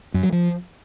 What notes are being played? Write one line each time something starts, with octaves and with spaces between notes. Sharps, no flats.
F#2
F#3
F3